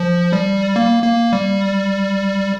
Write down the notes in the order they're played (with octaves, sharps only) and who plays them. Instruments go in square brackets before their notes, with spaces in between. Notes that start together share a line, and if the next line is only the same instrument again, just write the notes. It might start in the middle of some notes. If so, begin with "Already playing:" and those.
Already playing: [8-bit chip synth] F3
G3
A#3
A#3
G3